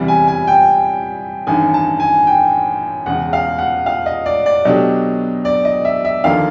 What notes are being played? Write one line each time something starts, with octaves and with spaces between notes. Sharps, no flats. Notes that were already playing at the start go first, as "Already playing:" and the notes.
Already playing: E2 C3 E3 G3
G#5
G#5
G5
A1 G2 D#3 G#5
A5
G#5
G5
E1 E2 C#3 F#5
F5
F#5
F5
D#5
D5
D5
B2 F#3 A3 D4 G4 D#5
D5
D#5
E5
E5
D#2 D3 F3 A#3 D#4 F5